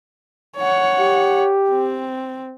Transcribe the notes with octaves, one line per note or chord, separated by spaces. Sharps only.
C#5 F#5
G4
C4